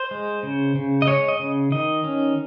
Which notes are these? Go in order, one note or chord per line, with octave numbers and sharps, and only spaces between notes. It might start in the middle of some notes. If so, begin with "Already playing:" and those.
Already playing: C5
G#3
C#3
C#3
D#5
G#3 C#5
D#5
C#3
D#3 D#5
C#4